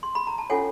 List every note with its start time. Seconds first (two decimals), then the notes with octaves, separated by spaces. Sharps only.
0.03 C6
0.15 B5
0.27 A#5
0.38 A5
0.50 C#4 F4 A4 C#5 F#5 G#5